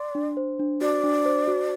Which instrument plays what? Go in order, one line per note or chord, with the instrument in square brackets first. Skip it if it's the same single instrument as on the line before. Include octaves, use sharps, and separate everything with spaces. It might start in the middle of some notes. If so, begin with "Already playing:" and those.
Already playing: [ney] D5 [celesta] C6
[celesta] D4
C5
D4
[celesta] F#4 [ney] D5
[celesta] D4
C5
F#4